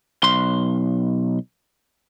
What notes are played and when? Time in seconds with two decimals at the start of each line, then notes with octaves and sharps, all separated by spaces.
0.23 B1 C6